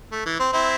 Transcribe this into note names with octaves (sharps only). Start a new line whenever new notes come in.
A3
E3
C4
C4 E4